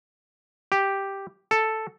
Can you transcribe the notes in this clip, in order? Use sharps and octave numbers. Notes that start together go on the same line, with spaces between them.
G4
A4